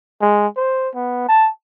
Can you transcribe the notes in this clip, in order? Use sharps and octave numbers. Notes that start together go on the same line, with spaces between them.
G#3
C5
B3
A5